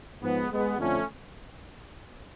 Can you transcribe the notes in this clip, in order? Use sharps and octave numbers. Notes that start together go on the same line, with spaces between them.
G#2 F3 G#3 B3
G#3 B3
F2 D3 F3 A3 C#4